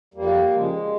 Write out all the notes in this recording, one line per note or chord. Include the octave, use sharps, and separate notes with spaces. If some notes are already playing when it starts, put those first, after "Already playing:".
F2 G3 A#3
C#3 F3 G#3